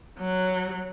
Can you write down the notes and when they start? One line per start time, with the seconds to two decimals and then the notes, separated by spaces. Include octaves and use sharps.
0.19 F#3